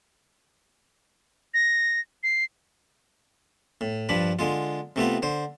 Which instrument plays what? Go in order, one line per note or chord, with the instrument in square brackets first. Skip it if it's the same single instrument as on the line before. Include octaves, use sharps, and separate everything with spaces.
[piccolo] A#6
C7
[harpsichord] A2
G2 F3 D4 B5
D3 G#3 F4
C3 A3 B3 F4
D3 C5